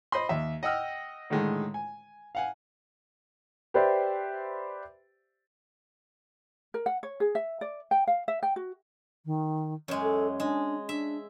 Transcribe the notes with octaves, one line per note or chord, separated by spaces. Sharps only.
C5 D#5 B5 C6
D#2 E5
D#5 F#5 G5 E6 F6
A2 D3 D#3 G#3
G#5
F5 F#5 G#5
G4 B4 C5 D5 E5
A#4
F#5
C#5
G#4
E5
D5
G5
F5
E5
G5
F#4
D#3
F#2 G#3
A4
G#3 D4
D4 E5